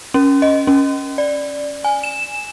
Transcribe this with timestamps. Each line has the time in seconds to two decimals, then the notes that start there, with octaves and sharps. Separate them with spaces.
0.14 C#4
0.42 D#5
0.67 C#4
1.18 D5
1.85 G#5
2.04 E7